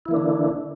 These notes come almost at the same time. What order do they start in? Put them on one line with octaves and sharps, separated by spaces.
E4 E3 A#3 D4 D3